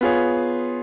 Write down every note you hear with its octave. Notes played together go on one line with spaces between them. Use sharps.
B3 F4 G#4 C#5